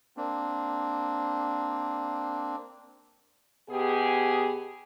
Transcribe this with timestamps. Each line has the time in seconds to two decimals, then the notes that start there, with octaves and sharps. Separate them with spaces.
0.17 A#3 C4 D4
3.69 B2 B3 G4 G#4